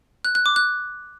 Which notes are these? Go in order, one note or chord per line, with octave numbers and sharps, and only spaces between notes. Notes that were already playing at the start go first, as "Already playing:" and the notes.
F#6
F#6
D6
F#6